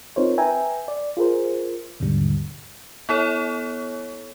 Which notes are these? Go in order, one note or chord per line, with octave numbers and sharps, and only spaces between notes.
C4 D#4 F4 A#4 C5 C#5
B4 E5 G5 G#5 A#5
D5
F4 G#4 A#4 C5
D#2 G#2 B2 D3 G3
B3 E4 A4 C#5